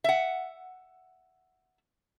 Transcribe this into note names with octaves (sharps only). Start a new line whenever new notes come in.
E5 F#5